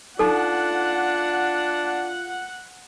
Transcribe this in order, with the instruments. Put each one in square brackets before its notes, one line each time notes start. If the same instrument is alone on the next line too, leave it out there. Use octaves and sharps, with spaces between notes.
[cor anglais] D4 [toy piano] D#4 A4 [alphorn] F4 [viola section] F#5